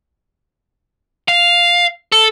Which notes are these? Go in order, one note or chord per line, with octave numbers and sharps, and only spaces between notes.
F5
A4